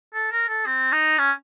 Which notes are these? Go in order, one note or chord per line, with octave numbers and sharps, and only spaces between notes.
A4
A#4
A4
C4
D#4
C#4